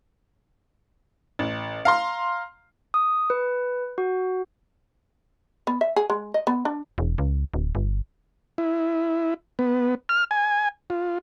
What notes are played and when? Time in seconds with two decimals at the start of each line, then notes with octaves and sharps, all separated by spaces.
1.39 A1
1.85 F5 A#5 C6
2.94 D#6
3.30 B4
3.98 F#4
5.67 B3
5.81 E5
5.96 G#4
6.10 G#3
6.34 D#5
6.47 B3
6.65 D4
6.98 E1
7.18 C#2
7.54 D1
7.75 G1
8.58 E4
9.59 B3
10.09 F6
10.31 G#5
10.90 F4